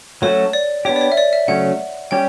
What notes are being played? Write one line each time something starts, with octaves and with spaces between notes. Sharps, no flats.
F#3 A3 C#4 F#4 A4 C#5
D5
B3 D4 G4 C#5
D5
C#5
E5
D5
E5
C#3 F#3 A3 C#4 F#5
G3 C#4 G4 G5